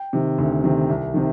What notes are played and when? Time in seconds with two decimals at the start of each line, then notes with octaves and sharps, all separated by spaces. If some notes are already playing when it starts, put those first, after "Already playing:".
Already playing: G5
0.13 C3 D#3
0.38 D2
0.64 C3 D#3
0.89 C2
1.14 C3 D#3